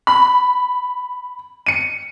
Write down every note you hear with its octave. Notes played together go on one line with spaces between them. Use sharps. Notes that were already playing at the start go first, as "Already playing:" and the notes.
B5
C#7 D#7